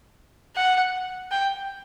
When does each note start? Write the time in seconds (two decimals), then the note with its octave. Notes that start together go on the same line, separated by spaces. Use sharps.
0.56 F#5
1.32 G5